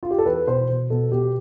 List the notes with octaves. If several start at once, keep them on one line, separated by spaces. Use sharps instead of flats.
F4
G4
A4
E2 B4
B2 C5
B2
B2 A4
B2 G4